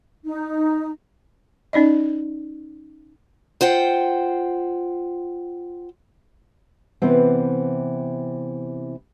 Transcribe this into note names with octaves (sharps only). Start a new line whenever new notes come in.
D#4
C#4 D#4 D5 D#5
F4 C5 F#5 G5
C3 E3 B3 C4